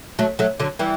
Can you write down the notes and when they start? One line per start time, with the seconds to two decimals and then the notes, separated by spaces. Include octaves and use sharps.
0.19 F#3 A3
0.39 F#3 A3
0.60 D3 F#3
0.79 E3 G3